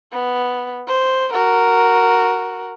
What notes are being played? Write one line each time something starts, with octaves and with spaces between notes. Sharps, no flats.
B3
C5
F#4 A#4